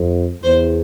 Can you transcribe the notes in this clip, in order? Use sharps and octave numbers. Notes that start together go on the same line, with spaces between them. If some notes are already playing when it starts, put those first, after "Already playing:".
Already playing: F2
E2 C5